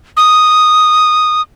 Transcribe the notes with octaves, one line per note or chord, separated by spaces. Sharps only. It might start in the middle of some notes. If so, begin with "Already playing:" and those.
D#6